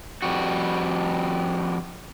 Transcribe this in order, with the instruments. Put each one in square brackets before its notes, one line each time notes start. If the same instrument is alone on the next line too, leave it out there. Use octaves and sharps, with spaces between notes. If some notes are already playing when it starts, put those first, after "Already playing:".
[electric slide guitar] F2 G3 F#4